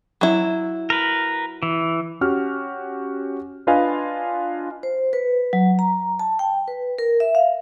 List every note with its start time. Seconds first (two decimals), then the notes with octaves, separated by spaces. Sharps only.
0.21 F#3 E4
0.90 A#4 B4
1.63 E3
2.21 C#4 F#4 G4 F6
3.67 D4 F4 B4 D#5 F5 G#5
4.83 C5
5.13 B4
5.53 F#3
5.79 A#5
6.19 A5
6.39 G5
6.68 B4
6.98 A#4
7.20 E5
7.35 F5